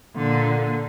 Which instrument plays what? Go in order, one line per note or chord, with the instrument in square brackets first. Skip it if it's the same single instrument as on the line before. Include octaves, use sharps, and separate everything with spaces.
[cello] A#2 D3